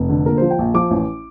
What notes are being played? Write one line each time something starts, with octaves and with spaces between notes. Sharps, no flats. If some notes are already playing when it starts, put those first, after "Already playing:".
Already playing: F1
D3
A#2 A#4
F3 C5
G5
A#1
F3 D6
A1